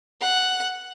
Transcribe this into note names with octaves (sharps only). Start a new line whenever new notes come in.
F#5